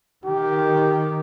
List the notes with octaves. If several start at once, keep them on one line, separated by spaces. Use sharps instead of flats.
D#3 G4